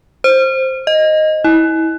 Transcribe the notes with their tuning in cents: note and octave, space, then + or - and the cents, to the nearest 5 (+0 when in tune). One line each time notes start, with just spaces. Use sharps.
C5 +10
D#5 +0
E4 -30